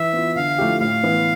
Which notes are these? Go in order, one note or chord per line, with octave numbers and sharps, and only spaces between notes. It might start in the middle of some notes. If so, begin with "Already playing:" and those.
Already playing: E3 E5
B3 F4
D3 F5
F3 A3 E4 G4
A2 F5
E3 B3